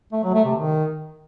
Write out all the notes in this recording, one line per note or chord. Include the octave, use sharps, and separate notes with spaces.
A3
F#3
A3
C3
D#3